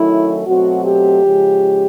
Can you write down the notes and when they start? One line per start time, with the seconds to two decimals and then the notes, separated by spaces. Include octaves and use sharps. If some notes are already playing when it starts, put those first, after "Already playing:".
Already playing: D#3 F#3 A3 C#4 E4
0.45 B2 F#3 A3 C4 F#4
0.84 G4
1.23 C#3 F3 G#3 C#4